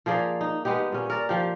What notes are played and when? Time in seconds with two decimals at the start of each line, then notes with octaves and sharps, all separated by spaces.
0.06 F3 A#3 G#4 D5
0.41 D#4
0.65 G#3 B3 D#4 G4
0.92 A#2 C#4
1.10 A#4 D5
1.29 F3 G4